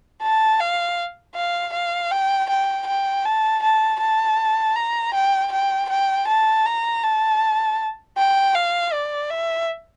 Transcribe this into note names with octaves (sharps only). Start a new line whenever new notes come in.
A5
F5
F5
F5
G5
G5
G5
A5
A5
A5
A#5
G5
G5
G5
A5
A#5
A5
G5
F5
D5
E5